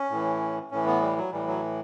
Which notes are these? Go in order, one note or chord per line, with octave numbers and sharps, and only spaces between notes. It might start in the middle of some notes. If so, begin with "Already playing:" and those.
Already playing: C#4
A2 E3
A2 E3 C#4
B3
G3
F#3
A2 E3 G3
F#3